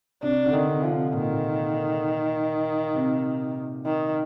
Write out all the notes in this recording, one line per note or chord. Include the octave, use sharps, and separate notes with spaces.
C3 D4
D3
D#3
C3
F3
C3
A#2 D#3
A#2
C3
D#3